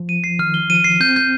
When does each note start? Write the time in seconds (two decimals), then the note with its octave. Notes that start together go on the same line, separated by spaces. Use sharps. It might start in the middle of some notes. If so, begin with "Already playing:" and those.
Already playing: F3
0.09 D#7
0.24 C7
0.39 D#3 F6
0.54 G7
0.70 F3 D#7
0.84 C7
1.00 C4 G6
1.16 G6